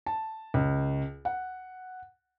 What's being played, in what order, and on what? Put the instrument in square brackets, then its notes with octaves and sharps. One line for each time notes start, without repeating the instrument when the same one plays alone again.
[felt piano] A5
C#2
F#5